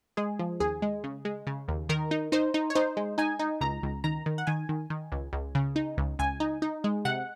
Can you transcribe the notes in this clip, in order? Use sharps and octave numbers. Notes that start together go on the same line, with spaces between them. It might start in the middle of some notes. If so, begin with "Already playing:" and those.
G#3 G#4
F3
D#2 G#4
G#3
C#3
G#3
C#3
D#2
D#3 A#4
D#4
D#4 C5
D#4
C#5
D#4 C5
G#3
D#4 G#5
D#4
C#2 A#5
C#2
D#3 A#5
D#3
F#5
D#3 G#5
D#3
D#3
C#2
C#2
C#3
D#4
C#2
C#2 G#5
D#4
D#4
G#3
C3 F#5